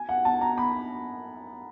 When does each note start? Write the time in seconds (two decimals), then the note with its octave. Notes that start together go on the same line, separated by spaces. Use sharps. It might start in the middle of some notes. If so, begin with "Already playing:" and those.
Already playing: G#5
0.09 F#5
0.25 A5
0.41 A#5
0.58 B5